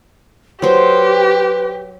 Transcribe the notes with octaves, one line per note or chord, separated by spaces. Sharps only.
F#3 G4 B4 C5